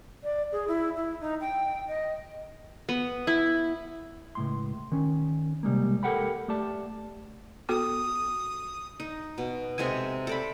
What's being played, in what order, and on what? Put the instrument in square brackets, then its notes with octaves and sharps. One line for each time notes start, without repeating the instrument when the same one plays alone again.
[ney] D5
G#4
E4
E4
D#4
G5
D#5
[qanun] B3
E4
[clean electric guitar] C#2 A2 C6
D#3 C#4
C3 G3 G#3 A#3
G4 A4 A#4 F#5 G5 B5
A3 G4 D5 A5
[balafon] B3 F#4 A4 [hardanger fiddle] D#6
[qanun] D#4
B2
C3 G#3 A4 G#5
A4 D5 B5